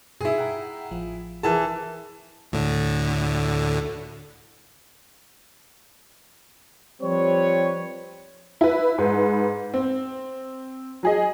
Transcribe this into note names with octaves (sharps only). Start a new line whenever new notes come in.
G2 B2 E4 G#4
F#5 G5 A#5
A1 F3
E3 G#4 A#4 A5 F6
D2 A2 D3
F3 G3 C4 B4 C#5
E4 B4
G#2 B4
C4
F#3 G#4 D#5